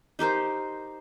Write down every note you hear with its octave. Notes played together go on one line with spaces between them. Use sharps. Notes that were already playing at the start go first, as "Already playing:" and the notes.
D#4 G4 A#4 C5